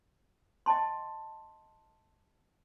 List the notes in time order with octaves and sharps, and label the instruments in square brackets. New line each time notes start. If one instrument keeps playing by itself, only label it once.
[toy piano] D#5 G5 A5 C6